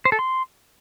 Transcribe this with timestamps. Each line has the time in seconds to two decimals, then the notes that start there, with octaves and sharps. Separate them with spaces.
0.05 C5
0.12 A4
0.19 C6